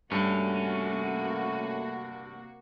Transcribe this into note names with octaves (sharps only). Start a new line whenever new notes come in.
G2 C3 A3 A#3 C#4 F#4